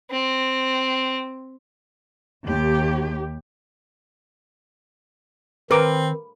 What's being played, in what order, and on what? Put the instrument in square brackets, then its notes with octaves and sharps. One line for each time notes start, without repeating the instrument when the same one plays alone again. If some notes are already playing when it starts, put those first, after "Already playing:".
[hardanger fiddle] C4
[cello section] D#2 G4
[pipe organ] D#3 [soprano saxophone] C4 [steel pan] A#4 D6 [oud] B4